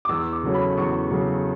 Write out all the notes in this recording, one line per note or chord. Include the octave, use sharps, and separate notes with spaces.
D6
E2 E6
D6
C#3 F#3 A3 C#4
B5
E2 C#6
C#3 F#3 A3 C#4